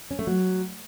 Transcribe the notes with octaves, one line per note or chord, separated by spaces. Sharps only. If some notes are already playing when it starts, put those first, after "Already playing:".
C#4
A3
F#3